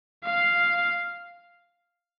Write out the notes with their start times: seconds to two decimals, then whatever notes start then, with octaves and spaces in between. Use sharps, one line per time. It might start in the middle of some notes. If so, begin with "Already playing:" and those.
0.25 F5